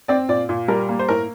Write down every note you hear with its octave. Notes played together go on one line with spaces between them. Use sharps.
C4 D5
A#2 D5
A#2
G3 A#4
A#3
C5
A2 A#4